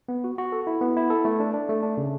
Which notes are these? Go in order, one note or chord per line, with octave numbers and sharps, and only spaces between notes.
B3
F#4
F#4
A4
E4
B3
E4
A4
A3
D4
D4
A3
D4
C#3